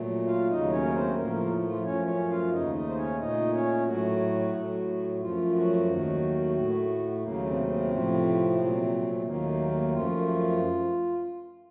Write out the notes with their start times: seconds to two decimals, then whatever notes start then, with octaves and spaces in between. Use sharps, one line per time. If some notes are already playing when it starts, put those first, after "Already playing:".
Already playing: A#2 F#3 A3
0.27 F4 F5
0.50 D#2 C#3 F#3 A3 D#4 D#5
0.72 C#4 C#5
0.83 A#4
0.95 C4 C5
1.17 A2 F3 A3 A#3 A#4
1.34 A#3 A#4
1.68 F3 F4
1.84 F#2 F3 A3 C#4 C#5
2.07 C#4 C#5
2.30 F4 F5
2.52 D#2 C#3 A3 D#4 D#5
2.75 D#4 D#5
2.88 C5
2.97 C#4 C#5
3.19 A#2 A3 D#4 D#5
3.53 C#4 C#5
3.86 A2 F#3 A3 F#4
4.54 A2 F#3 A3
5.21 F#2 F3 A3 F4
5.55 F#3 F#4
5.89 D#2 D#3 F#3 A3
6.56 A2 A3
7.23 D#2 C#3 F#3 A3 A#3
7.46 C3 C4
7.68 C3 C4
7.91 A2 F3 A3
8.59 A#2 F#3 A3
9.25 D#2 D#3 F#3 A3 A#3
9.48 A#3
9.71 A#3
9.93 F#2 F3 A3 F4